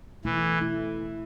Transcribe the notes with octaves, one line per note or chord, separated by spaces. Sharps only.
B2 E3 A3 E4
B2 A3 E4